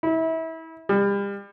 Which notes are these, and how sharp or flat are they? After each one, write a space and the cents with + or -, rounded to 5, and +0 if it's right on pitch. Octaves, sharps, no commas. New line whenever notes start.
E4 -30
G3 +35